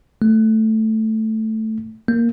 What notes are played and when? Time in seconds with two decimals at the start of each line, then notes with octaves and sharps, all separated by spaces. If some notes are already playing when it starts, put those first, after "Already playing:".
0.22 A3
2.08 A#3